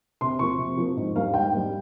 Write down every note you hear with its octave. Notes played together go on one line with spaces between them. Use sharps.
C3 C6
F3 A#3 C#6
C3
F3 A#3
G#2
G3 A#3 F5
G#2 G5
G3 A#3